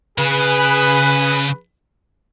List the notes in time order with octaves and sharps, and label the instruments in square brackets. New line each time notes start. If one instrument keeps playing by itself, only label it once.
[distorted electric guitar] C#3 [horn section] G#4 B4